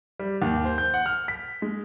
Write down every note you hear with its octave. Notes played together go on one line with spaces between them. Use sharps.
G3
D#2
C5
G6
F#5
F6
B6
G#3